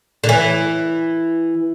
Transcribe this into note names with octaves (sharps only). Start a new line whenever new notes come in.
D3
E3